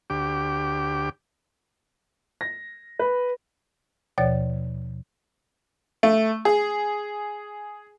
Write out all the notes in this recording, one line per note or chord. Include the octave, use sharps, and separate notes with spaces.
D2 G4 D6
A#6
B4
D#2 B2 F3 C#5 D5 A6
A3
G#4